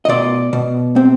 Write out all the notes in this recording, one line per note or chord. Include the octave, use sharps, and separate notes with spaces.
D#5
B2 D5
B2
C4